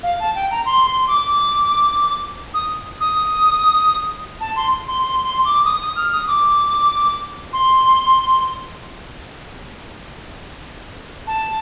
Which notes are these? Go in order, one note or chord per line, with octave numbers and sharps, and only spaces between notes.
F5
A5
G5
A#5
C6
C6
D6
D6
D#6
D#6
A5
C6
C6
C6
C6
D6
D#6
D#6
F6
D#6
D6
C6
A5